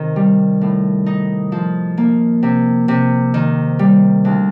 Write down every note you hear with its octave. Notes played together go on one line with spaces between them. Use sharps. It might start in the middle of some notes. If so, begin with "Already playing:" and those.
Already playing: C3 D#3
G3
A2
D#4
F3
A#3
C3
C3
D#3
G3
D2